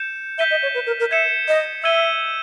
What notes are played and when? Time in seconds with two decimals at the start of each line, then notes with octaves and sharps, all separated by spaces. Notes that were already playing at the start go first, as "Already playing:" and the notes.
Already playing: G6 C#7 E7
0.38 E5 G6 B6 D#7 G7
0.51 D#5
0.63 C#5
0.74 B4
0.87 A#4
1.00 A#4
1.11 E5 G#6 C#7 E7
1.48 D#5
1.83 E5 E6 G#6 D#7 G7